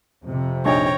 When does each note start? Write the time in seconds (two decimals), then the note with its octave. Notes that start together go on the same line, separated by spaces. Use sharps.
0.23 F2 C3
0.65 A#1 D#4 C#5 G5 A#5